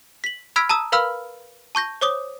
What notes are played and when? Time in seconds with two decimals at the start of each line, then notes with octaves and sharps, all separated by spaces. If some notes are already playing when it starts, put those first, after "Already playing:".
0.24 B6 F#7
0.56 B5 E6 F6 G#6 B6 D7
0.69 A5 A#5 D#6 E6
0.92 A#4 B4 F5 B5 E6 F6
1.75 A5 C#6 G6 A#6
2.01 C5 C#5 D6 D#6 G7